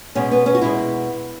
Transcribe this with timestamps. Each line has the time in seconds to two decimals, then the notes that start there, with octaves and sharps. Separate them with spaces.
0.15 B2 G#3 C#4
0.31 B3
0.46 C#4
0.55 F#4
0.62 B2 G#3 E4